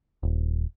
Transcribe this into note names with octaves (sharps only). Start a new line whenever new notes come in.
D#1